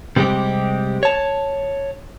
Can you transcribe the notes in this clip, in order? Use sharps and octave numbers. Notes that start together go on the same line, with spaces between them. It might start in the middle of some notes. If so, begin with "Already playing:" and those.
C3 G3 G#3 C4 G4
C#5 A5